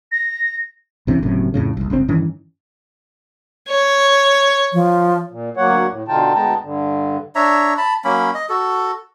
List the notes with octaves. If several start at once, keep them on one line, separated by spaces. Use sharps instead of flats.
A#6
C#2 C3 E3 C#4
F#1 F#2 A2 C3
F2 A2 C#3
F1 C2
G1 C#2 B2 C4
G2 D#3 E3 C#4
C#5
F3
A#2
D2 F#3 A#3 C#5 F#5
A2
B2 D3 D#4 F4 G5 A5
D2 G#3 B3 G5 A5 A#5
G2 D3
D4 C#5 E5 A#5
A5 B5
F#3 A#3 C#4 B5
D#5
F#4 A4